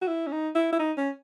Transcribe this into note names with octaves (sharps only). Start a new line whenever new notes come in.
F#4
E4
C#4
D#4
E4
E4
D#4
C#4